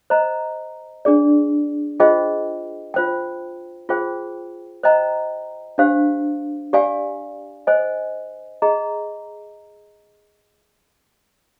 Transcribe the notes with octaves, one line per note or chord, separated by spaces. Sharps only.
C5 D#5 A#5
D4 G#4 D5
F4 G#4 C5 D#5 G5
F4 C5 G5
F4 G#4 C5 G5
C5 D#5 G5 A#5
D4 G4 C5 F5
G4 D5 F5 G#5
C5 D#5 G#5
G#4 D#5 A#5